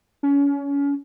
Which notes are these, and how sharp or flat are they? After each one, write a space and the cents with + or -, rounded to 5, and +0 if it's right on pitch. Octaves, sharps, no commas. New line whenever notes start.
C#4 +30